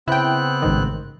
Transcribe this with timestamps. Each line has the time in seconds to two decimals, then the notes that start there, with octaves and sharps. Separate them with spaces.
0.08 C#3 B3 C4 E4 G5 F#6
0.62 A1 G#2 D#3